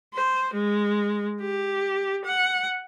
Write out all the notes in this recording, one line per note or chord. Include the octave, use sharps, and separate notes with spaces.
C5
G#3
G4
F#5